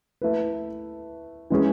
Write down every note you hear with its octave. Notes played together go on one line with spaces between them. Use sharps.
A3 E4 B4
E3 G#3 C#4 G#4